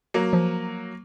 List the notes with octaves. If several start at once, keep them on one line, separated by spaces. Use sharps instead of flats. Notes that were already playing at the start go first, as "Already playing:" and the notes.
F#3 A#3
F3